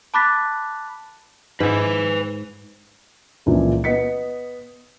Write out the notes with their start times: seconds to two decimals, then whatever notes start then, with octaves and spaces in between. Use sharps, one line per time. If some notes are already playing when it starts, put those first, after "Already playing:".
0.14 A5 B5 D6 F#6 A6 B6
1.60 G#2 B4 G#5
3.46 C#2 A#2 E3 F3
3.84 B3 D#5 B6 C#7